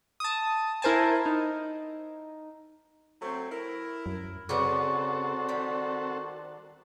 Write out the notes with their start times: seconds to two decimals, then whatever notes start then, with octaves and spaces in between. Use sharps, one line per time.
0.20 A5 D#6
0.82 E4 A#4 C5 G#5 A5
1.26 D#4
3.22 F#3 A3 C4
3.51 E4 A#4
4.06 F#2
4.49 C#3 G3 B3 C4 F#4 A4 C#6 D6
5.49 D#3 G3